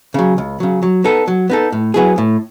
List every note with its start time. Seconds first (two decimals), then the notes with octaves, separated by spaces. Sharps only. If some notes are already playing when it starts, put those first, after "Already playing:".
0.14 C#3 F#3
0.38 C#2
0.60 C#3 F#3
0.83 F#3
1.04 B3 D#4 A4
1.28 F#3
1.50 B3 D#4 A4
1.72 A2
1.94 F#3 B3 E4 G#4
2.18 A2